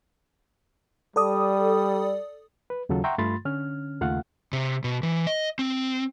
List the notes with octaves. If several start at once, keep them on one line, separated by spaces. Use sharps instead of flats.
G3 A4 D5 D#6
B4
D#2 C#3 F#3 F4 A4
E5 F#5 G5 A#5 C6 C#6
G2 A3 F4 B5 C6 A6
D3 C#4 F6
D#2 C#3 A3 F4 F5 F#5
C3
B2
E3
D#5
C4